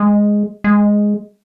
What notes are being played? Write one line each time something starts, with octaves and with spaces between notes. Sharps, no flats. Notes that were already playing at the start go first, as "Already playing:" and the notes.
Already playing: G#3
G#3